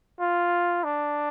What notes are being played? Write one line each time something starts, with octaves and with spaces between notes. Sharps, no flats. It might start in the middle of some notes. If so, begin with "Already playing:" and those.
F4
D4